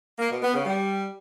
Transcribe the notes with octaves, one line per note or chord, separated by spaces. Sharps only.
A#3
B2
B3
C#3
G3